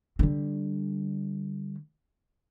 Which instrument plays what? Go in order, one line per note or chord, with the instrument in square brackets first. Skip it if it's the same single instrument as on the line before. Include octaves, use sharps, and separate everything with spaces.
[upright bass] D3 G3